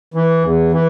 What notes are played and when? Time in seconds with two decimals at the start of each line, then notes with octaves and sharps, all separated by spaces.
0.14 E3
0.43 E2
0.72 E3